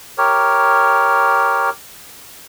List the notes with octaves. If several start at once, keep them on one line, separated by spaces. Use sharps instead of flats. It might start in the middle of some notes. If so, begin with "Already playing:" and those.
G4 A#4 C#5